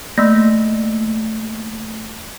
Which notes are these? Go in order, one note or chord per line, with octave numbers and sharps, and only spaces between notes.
A3 A#3